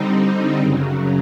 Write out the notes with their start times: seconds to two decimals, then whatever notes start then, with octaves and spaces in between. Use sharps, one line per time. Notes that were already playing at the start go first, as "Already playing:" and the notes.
Already playing: D3 G3 C4 D#4
0.59 F#2 C#3 F#3